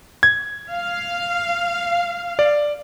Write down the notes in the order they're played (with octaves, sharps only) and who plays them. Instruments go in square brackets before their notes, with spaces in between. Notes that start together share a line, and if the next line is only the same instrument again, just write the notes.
[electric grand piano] G#6
[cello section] F5
[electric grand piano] D5